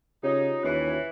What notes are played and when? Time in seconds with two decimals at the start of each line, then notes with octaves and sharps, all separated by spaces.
0.23 C#3 C#4 D#4 F4 G4 C#5
0.64 D#2 E3 B4